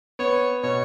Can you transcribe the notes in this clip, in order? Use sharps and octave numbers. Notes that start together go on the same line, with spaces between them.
B3 C#5
B2 C#5